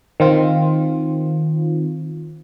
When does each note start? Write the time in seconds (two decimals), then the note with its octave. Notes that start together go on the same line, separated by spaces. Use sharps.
0.20 D#3 C4 F4